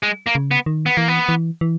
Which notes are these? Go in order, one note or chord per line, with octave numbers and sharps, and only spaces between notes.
G#3
A#3
C#3
B3
D#3
B3
E3 A#3
B3
E3
E3